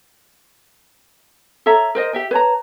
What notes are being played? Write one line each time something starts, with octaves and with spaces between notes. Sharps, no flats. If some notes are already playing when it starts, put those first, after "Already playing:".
A4 C#5 E5 A#5
A#4 C5 D#5
G4 E5 G5
B4 C#5 A5 A#5